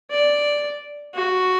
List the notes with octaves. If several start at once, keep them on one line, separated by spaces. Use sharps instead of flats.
D5
F#4